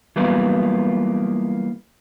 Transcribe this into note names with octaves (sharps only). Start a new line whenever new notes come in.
E3 F#3 G3 A#3 B3 F4